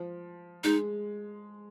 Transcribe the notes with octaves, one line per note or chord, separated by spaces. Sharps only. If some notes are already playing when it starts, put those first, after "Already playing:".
Already playing: F3
G#3 D#4